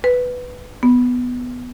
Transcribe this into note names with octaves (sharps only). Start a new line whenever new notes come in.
B4
B3